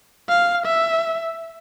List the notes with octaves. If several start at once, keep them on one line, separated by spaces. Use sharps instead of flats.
F5
E5